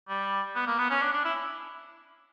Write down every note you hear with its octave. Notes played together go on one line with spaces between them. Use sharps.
G3
B3
A#3
B3
C#4
D4
D4
E4